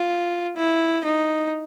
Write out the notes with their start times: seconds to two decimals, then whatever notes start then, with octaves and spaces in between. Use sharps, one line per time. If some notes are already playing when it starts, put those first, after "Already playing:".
Already playing: F4
0.57 E4
1.05 D#4